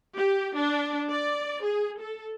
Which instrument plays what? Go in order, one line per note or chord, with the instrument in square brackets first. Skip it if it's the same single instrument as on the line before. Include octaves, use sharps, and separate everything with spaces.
[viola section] G4
D4
D5
G#4
A4